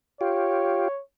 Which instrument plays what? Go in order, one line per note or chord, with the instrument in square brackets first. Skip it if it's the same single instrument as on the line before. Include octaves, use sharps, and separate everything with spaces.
[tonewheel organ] F4 G4 [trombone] C#5